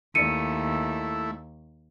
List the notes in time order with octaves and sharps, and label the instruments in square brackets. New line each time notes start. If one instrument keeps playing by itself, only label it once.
[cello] D#2 [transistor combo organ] A3 E4 [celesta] C#7 D#7